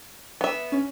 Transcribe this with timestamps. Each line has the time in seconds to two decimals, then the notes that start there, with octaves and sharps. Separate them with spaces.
0.41 B3 E5
0.72 C#4